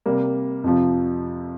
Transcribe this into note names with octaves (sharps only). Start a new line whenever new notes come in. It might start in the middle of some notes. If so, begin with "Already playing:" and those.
C3 G3 A#3
F2 C3 F3